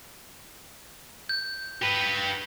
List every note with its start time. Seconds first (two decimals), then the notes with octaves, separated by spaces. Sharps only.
1.29 G6
1.82 G4 B4